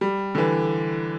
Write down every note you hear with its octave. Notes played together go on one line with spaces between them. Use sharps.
G3
D3
E3